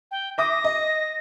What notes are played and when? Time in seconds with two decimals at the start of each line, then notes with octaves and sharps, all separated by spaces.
0.11 G5
0.38 E5 D6 D#6 A#6
0.64 D#5